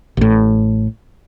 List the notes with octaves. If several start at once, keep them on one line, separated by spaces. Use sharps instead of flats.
A1 A2